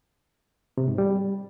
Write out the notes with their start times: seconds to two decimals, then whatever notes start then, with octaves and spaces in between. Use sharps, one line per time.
0.77 C3
0.88 G#2
0.98 G3